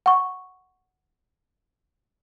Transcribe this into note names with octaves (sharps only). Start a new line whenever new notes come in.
F#5 C#6